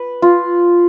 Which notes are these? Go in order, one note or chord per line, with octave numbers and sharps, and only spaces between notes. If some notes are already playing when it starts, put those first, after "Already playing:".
Already playing: B4
F4